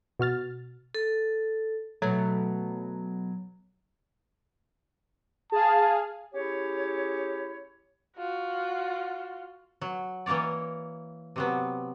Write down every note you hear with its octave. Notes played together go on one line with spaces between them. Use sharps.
B2 F#4 F6 A6
A4
B2 F#3 A3
G#4 F5 A5
C#4 E4 G4 G#4 C#5
F4 F#4
F#3
E3 A#3 A#4 C#5 D5
C3 F#3 B3